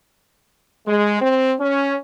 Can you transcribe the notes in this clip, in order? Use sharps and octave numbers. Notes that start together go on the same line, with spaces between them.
G#3
C4
C#4